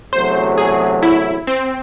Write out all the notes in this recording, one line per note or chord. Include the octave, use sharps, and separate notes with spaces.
E2 C3 F#3 A3 C5
G#4
E4
C4